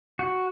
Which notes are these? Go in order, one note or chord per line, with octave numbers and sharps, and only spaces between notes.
F#4